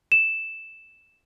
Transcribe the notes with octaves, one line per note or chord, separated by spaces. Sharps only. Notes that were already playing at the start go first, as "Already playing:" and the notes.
E7